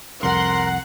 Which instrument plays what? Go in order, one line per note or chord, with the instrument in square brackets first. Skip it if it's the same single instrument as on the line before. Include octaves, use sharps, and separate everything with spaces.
[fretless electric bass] C2 F2 [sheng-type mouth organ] A#4 [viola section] F#5 [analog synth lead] C6